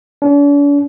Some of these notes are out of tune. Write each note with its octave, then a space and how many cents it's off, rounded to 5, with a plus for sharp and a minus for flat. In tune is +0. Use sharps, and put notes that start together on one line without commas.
D4 -45